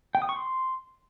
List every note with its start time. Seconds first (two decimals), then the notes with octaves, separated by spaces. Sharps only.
0.15 G5
0.22 D#6
0.29 C#6
0.36 C6